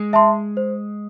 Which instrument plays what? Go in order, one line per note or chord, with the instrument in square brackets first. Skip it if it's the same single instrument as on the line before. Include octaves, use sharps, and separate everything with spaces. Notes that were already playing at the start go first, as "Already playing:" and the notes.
Already playing: [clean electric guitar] G#3
[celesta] E5 A5 C6
C5